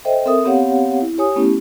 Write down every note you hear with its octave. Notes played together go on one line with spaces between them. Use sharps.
A4 C5 D#5 E5 G5
C4 A4 A#4 E5 D#6
B3 C4 G4 C#5 F5 F#5
E4
G4 C#5 G#5 D#6
A3 B3 C#4 E4 G4